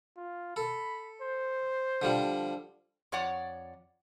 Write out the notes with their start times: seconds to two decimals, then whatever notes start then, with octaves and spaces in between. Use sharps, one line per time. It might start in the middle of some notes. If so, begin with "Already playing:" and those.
0.17 F4
0.56 A4 B5
1.22 C5
2.02 D3 F3 G3
3.12 F2 C#5 D5 F#5